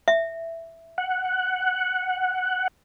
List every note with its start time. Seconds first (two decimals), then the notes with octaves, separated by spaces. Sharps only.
0.08 E5
0.98 F#5